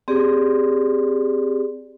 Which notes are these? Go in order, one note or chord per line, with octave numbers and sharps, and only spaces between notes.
C4 G4 G#4 D5